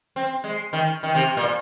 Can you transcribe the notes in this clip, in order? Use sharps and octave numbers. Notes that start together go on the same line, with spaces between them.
C4
G#3
D#3
D#3
C3
A#2